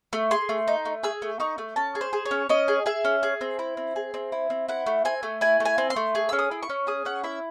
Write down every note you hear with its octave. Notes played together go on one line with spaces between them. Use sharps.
A3
G#4 C6
A3
D#4
A3
G#4 E6
A3
D#4 C#6
A3
C#4 A5
G#4
C5
G#4
C#5
C#4
C#4 D#5
G#4
G#4 E5
C#4
G#4
C4
E4
C4
G#4
C4
E4
C4
E4 F#5
A3
C4 G#5
A3
E4 G#5
A3
G#5
C4
C6
A3
G#4
C#4 E6
D#6
E4
C#6
C#4
G#4 D#6
C#4 F#5
E4 E5